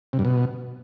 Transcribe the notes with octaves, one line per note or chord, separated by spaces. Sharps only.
C3
G2
B2